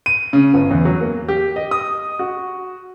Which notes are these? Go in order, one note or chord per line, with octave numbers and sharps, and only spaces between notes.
D#7
C#3
G1
E2
F#3
A#3
G4
D#5
D#6
F#4